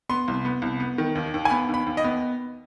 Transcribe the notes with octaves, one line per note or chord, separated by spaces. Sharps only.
B3 C6
C2
B3
C2
B3
D#3
D#2
D#2
G#5
B3 B5
D#2
B5
D#2
D#5
B3